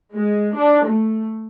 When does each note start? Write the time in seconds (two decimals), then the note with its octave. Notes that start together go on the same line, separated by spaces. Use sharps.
0.14 G#3
0.55 D4
0.85 A3